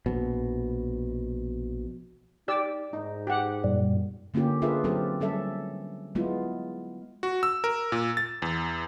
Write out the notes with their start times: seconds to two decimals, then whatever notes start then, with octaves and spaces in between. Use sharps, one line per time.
0.06 A#1 B2
2.48 D#4 G4 D5 E6
2.93 G#2 D#4
3.27 G4 F#5
3.64 F#2 A#2 G3
4.34 D3 A#3 C#4 F4 G4
4.62 D4 F4 G#4 A#4 B4 E5
4.84 F#3 C4 C#4 G4 A4
5.21 G3 C#4 A4 E5
6.15 F#3 G#3 B3 E4 F4
7.23 F#4
7.43 E6
7.64 A#4
7.92 A#2
8.17 A6
8.42 E2